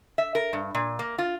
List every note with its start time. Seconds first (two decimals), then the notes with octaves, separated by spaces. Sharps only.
0.18 E5
0.35 A#4
0.53 G2
0.75 A#2
0.99 A#3
1.18 F4